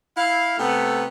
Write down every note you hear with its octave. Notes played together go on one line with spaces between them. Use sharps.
E4 F5
C3 A3 B3